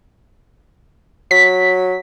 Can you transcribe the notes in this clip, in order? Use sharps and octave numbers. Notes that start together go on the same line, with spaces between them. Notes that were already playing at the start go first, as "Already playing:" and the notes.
F#3 B6